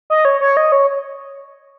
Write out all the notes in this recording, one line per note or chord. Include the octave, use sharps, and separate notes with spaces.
D#5
C#5
C#5
D#5
C#5